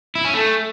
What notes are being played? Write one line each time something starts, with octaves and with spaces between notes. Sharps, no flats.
E4
C#4
A3